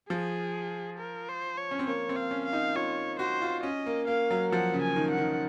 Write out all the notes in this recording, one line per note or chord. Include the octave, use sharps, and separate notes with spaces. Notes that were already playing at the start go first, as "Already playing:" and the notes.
F3 G#4
A#4
C5
C#5
C#4
C4
A#3 C#5
C4
F5
C#4
F5
D#4
F4 C#5
F#4 C5
F4
C#4 D#5
A#3
A#3 F5
F#3
F3 F#5
C#3
G#5
D#3
F#5
D#3